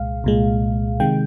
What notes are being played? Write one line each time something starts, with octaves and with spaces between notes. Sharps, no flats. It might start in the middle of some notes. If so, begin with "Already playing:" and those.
Already playing: C2 A#2 G#3 F5
C2 A#2 G#3
C3 D#3 G#3 G5